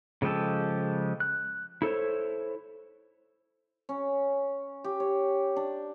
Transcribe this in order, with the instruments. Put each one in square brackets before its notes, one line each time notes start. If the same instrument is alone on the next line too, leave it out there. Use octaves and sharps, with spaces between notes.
[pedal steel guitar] C#3 F3 G#3 G4 A4
F#6
E4 A4 C5 C#5
[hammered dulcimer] C#4
G4
C#5
D4